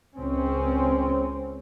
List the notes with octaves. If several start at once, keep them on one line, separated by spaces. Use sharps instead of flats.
C#2 C4 C#4